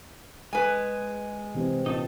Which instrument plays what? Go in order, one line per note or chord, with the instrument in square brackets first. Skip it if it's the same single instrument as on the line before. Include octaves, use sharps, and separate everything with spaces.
[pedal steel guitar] G#3 [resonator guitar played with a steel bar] B4 G#5
[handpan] C3 E3 C4
[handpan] A#2 [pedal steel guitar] D#4 A5